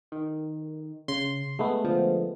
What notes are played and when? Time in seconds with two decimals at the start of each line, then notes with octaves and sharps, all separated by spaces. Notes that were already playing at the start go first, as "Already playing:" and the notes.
0.12 D#3
1.08 C#3 C6
1.59 G#3 A3 B3
1.84 D3 F3